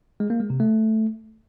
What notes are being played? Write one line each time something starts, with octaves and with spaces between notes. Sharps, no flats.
G#3
A#3
G#3
C3
A3